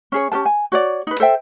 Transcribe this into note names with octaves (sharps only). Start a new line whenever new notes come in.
C#4 G#4 C#5
C#4 G4 A#4 A5
G#5
F#4 C#5 D5
D#4 B4
A4 C5 E5 G5